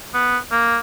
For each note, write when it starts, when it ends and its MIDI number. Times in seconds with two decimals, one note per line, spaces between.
0.14 0.38 59
0.52 0.79 58